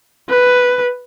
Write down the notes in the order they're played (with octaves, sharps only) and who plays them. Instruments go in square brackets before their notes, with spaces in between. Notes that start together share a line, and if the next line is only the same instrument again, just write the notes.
[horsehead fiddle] B4